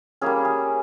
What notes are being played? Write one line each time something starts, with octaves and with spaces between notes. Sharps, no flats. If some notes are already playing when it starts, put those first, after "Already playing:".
G3 A#3 C#4 G#4
G#4